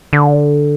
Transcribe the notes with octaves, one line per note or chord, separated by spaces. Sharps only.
D3